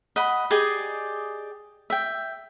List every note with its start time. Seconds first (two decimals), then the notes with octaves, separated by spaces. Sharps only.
0.16 D#5 F#5 B5
0.50 G4 G#4 D5 D#5
1.90 E5 G5